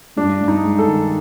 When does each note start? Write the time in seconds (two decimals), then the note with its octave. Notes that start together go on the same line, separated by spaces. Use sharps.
0.17 G2 D4
0.41 G2
0.48 D#4
0.64 G#3
0.79 A4
0.88 D#3